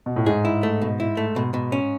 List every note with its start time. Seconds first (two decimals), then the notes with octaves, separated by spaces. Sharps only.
0.06 B2
0.16 A2
0.26 G#2 G#4
0.45 E4
0.63 A3
0.82 B2
1.00 E4
1.17 A3
1.36 B2
1.54 B2
1.72 C#4